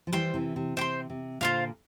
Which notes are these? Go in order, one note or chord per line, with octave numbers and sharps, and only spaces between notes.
F3
E3 G3 C5 G5 C6
C3 E3
C3
C3 C5 G5 C6
C3
A#2 D3 F4 C5 F5